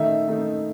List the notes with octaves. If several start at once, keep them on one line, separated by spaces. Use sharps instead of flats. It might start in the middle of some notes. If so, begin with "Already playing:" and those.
Already playing: D#3 A3 D#4 E5
D#3 A3 D#4